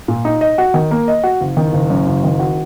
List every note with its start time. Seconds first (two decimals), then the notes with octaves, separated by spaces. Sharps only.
0.08 A#2
0.25 D#4
0.41 D#5
0.58 F#4
0.74 D#3
0.91 A#3
1.08 D#5
1.23 F#4
1.41 F#1
1.57 D#3
1.73 F#1
1.90 F#2
2.07 F#1
2.24 D#3
2.39 F#4